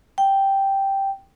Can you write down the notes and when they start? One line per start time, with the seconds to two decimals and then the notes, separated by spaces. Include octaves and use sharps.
0.18 G5